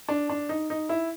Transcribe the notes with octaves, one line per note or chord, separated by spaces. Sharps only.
D4
D4
D#4
D#4
E4